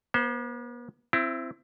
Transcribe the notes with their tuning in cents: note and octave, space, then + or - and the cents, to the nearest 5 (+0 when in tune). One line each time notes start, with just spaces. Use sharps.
B3 -45 C5 +0
C4 +0 E4 +25